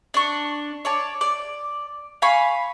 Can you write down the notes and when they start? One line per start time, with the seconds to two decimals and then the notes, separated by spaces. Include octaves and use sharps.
0.14 D4 C#6
0.85 C#5 D5 A5
1.21 D5
2.22 F5 G#5 B5 C#6